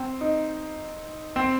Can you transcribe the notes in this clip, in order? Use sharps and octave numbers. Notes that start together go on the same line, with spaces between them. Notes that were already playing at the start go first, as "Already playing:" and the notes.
Already playing: C4
D#4
C4